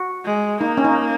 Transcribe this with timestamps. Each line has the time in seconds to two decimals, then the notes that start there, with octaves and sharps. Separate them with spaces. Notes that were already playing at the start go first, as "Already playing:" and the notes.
Already playing: F#4
0.25 G#3
0.61 A#3 D#4
0.77 C#4
0.84 D#4